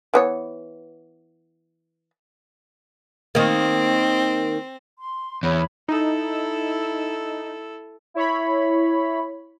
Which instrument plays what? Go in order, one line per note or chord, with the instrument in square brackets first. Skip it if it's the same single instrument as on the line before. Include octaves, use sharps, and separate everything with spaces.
[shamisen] E3 B3 C#5
[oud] D#3 A#3 [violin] C4
[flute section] C6
[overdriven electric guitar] E2 [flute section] C#5 B5
[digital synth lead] D#4 [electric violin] E4 A4
[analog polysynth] E4 C#5 B5